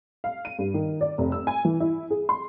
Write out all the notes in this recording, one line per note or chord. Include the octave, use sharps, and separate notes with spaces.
F5
D#7
G2
D#3
D5
F1
E6
G#5
E3
E4
G#4
C6